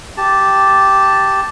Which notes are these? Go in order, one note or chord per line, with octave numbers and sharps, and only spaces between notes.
G4 A5